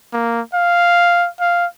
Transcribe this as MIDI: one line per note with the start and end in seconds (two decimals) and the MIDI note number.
0.13 0.41 58
0.54 1.28 77
1.40 1.66 77